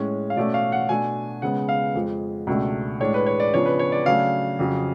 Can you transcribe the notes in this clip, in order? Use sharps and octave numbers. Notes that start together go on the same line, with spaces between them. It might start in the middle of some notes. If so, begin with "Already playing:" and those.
Already playing: A2 G#3 C#4
F5
B2 A3 C#4 D5
F5
F#5
B2 A3 D4 G#5
C#3 G#3 B3 F#5
F5
F2 F3 G#3
C#2 B2 A3 D4
A2 G#3 D4 C#5
B4
C#5
D5
C#3 F3 B3 D4 C#5
B4
C#5
D5
C#3 F#3 A3 D4 F5
F2 C#3 F#3